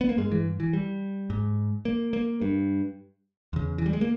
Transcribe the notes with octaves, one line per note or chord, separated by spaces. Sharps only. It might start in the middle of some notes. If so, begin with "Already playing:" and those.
B3
A#3
G2 G#3
E3
E3
G3
G#2
A#3
A#3
G2
E2 C#3
E3
G3
G#3
A#3